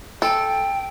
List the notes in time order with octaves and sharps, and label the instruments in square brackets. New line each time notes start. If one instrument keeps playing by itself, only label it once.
[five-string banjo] A4 [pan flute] G5